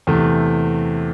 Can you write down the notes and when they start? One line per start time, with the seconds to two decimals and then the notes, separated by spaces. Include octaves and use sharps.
0.07 E2 C3 E3 A3